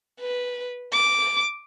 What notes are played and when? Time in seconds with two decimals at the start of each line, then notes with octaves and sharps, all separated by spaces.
0.20 B4
0.92 D6